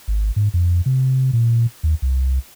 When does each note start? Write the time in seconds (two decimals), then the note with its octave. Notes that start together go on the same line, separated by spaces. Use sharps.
0.08 G#1
0.36 G#2
0.54 F2
0.86 C3
1.33 A#2
1.83 D#2
2.02 C2